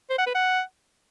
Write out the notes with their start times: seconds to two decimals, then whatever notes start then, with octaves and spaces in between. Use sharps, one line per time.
0.10 C5
0.18 F#5
0.27 B4
0.35 F#5